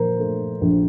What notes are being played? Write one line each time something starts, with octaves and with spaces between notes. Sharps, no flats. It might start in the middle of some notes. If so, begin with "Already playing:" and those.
Already playing: A#2 F3 A#4 C5
A3
A#1